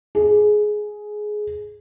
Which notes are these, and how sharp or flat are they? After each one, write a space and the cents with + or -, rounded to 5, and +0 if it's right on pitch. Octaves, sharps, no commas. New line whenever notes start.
G#4 +15